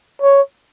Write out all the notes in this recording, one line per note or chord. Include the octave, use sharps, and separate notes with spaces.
C#5